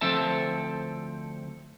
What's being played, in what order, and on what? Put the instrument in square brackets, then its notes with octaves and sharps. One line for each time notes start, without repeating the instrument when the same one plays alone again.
[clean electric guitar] D2 F3 C4 A4 E5 A5